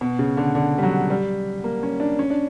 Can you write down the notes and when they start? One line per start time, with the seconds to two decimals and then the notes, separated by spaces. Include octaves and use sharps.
0.01 B2
0.19 C#3
0.37 D3
0.55 D3
0.78 G3
0.83 F#3
1.10 G3
1.64 A#3
1.83 C#4
2.00 D4
2.19 C#4
2.30 D4